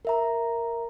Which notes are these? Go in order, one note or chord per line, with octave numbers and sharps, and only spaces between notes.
A#4 E5 A#5